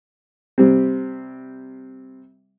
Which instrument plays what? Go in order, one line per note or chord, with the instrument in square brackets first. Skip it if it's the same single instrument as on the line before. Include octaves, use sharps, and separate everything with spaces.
[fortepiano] C3 G3 C4